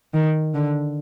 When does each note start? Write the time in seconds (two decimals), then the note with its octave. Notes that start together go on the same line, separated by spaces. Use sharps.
0.14 D#3
0.54 D3